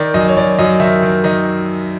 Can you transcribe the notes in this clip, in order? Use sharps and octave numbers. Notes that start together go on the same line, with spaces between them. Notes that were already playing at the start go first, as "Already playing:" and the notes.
Already playing: D#3 D5
F#2 D#5
C#5
F#2 D5
F#2 D#5
D#3 E5
D#3
D#3 D#5